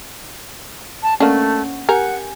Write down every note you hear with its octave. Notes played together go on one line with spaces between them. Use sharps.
A5
A3 A#3 C#4 D4 F#5
G4 A#4 F#5 G#5